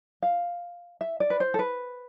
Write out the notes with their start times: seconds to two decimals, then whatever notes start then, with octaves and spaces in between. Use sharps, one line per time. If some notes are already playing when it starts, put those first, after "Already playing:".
0.22 F5
1.01 E5
1.20 D5
1.30 B4
1.40 C5
1.54 A4
1.59 B4